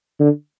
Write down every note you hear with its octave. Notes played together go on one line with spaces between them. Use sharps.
D3